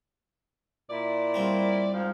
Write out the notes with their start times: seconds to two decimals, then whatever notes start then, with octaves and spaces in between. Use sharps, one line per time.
0.90 A#2 E4 D5
1.34 C2 C4 F4
1.93 G#2 F3